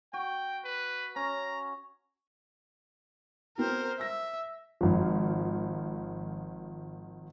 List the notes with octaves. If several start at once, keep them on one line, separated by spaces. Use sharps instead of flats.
F#4 G5
B4
C#4 A#5
B3 C4 F#4 A#4 C5
E5 E6 A#6
G#1 F3